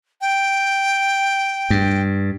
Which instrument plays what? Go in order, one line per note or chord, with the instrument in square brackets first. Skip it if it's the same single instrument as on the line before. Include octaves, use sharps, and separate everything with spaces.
[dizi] G5
[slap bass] G2